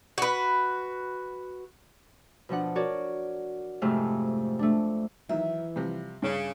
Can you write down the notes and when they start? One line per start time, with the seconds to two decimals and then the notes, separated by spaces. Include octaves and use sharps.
0.18 F#4 B4
2.49 B2 F3 D4 F#5
2.76 F#4 A#4 C#5 D5
3.82 F2 G#2 C3 A3 F5
4.59 A3 D4
5.29 D#3 E3 F#3 E5
5.76 C3 F3 G3
6.22 G2 C#3